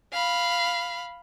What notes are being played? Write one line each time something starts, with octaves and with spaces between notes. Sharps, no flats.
F5 B5